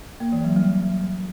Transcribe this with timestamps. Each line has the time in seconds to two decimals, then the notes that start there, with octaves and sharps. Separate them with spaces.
0.20 A#3
0.32 E3
0.44 F#3
0.56 G3